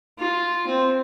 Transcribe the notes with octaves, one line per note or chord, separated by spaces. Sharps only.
F4
C4